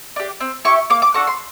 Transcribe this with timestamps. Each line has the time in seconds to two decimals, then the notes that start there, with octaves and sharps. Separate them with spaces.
0.16 D4 G4
0.40 C4
0.65 E4 G4 C#6
0.90 A#3 D6
1.02 D6
1.14 D4 F#4 A4 C#6
1.27 C6